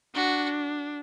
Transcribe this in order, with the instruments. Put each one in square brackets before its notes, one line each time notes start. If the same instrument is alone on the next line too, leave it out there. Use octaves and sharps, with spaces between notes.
[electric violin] D4 [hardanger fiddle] F#4